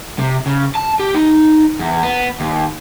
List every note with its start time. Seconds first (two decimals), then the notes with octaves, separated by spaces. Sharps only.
0.19 C3
0.46 C#3
0.75 A5
1.00 G4
1.14 D#4
1.79 E2
2.03 B3
2.40 D#2